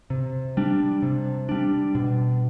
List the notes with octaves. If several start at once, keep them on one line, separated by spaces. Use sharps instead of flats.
C3
G3 D4
C3
G3 D4
B2